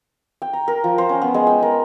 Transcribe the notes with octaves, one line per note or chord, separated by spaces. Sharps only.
G5
A#5
A#4
F3
C5
C#4
B3
G#3
G5
A#4